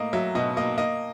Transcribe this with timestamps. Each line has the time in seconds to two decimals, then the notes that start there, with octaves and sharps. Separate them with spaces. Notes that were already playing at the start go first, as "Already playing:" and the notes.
Already playing: A2 A#3 D#5
0.13 F#3 E5
0.35 B2 D#5
0.57 A#3 D#5
0.78 A#3 D#5